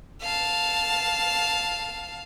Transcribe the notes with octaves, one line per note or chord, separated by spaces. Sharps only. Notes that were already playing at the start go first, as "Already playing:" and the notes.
F5 A5